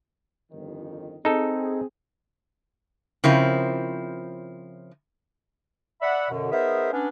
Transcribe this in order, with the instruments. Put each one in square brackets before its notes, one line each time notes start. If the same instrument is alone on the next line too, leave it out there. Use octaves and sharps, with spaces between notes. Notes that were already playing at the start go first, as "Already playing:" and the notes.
[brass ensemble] G1 F2 D#3
[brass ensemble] C4 G#4 [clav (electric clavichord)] D#4 A4
[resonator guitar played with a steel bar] C#3 F3 C4 E4 A#4
[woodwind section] D5 E5 F#5 B5
F#2 B2 D3
B3 D#4 G#4 A#4 C5 E5
B3 C#4 D4